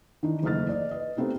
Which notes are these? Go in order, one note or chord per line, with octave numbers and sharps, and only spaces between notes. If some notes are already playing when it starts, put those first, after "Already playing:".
D#3 E3 D4 D#4
F#1 E2 A3 D#5 F6 A6
D5 D#5
B4 D#5
A3 B3 C4 D#4 G4